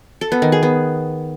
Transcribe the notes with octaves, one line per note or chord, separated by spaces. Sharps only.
A4
B3
D#3
G#4
B3